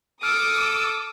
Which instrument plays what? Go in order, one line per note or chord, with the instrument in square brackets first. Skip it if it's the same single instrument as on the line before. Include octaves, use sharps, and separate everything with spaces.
[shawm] A4 [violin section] D6 D#6 [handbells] F6